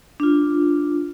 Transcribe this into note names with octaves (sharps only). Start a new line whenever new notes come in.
D4 F4